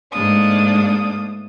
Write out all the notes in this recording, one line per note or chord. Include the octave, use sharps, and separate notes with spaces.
G#2 A3 A#3 D4 D#6